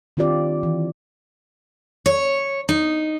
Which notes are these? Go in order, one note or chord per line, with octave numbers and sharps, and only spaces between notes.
D#3 C4 F4 G4 D5
E3
C#5
D#4